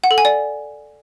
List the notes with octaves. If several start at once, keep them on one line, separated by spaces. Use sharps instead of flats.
F#5
A4
G#5
D5